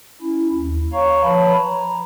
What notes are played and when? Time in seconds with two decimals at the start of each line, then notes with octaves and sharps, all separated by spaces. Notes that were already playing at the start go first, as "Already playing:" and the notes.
0.22 C#4 E4
0.54 D#2
0.93 C#5 F5 A#5 C#6
1.22 F3 B4 C#5 A5 B5
1.63 A#5